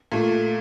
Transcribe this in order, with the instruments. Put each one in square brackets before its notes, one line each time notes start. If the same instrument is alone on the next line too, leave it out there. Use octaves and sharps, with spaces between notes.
[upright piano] A#2 A3